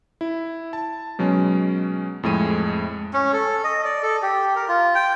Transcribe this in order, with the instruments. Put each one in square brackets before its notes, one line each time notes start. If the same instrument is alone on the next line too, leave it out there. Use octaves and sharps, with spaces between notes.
[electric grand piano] E4
A5
B2 F#3 G#3 C#4
F2 A2 G#3 D#7
[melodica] C#4
A4
D#5
D5
A4
G4
A#4
F4
G5